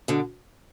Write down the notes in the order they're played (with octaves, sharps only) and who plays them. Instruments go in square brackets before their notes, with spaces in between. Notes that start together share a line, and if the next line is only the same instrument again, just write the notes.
[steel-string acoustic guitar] B2 D3